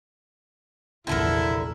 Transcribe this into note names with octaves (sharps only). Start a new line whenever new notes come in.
F1 A#1 E2 D3 E4 A4 A#4